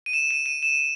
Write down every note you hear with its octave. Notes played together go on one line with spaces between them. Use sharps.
D#7
E7
D#7
D#7
E7